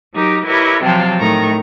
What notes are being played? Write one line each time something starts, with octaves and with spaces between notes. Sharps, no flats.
F#3 D#4 G4 A#4
E4 G4 A#4 B4 C#5 D#5
C3 F3 F#3 F5 G5 A5
A2 D#3 A#5 C#6